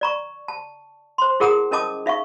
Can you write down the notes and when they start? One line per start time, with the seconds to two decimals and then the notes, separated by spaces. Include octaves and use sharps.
0.01 D5 A#5 C#6
0.48 A5
1.18 C5 C6
1.40 E4 G#4 A#4 F#5 A#5 D#6
1.71 C#4 A#4 D#5 A5 D6 D#6
2.06 D#4 E5 F5 C#6